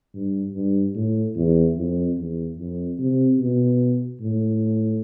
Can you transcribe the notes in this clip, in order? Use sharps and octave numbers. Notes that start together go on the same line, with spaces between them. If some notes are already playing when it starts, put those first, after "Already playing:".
G2
G2
A2
E2
F2
E2
F2
C3
B2
A2